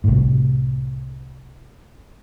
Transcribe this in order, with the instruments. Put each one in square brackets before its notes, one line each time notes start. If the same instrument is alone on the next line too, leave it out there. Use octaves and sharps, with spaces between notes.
[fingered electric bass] C2 A2